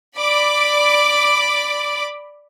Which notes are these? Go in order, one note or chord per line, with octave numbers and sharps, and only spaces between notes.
D5 B5 D6